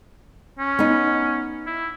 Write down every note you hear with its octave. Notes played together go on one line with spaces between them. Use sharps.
C#4
B3 D#4
E4